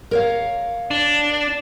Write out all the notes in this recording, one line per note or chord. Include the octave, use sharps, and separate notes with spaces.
A#4 C#5 F5
D4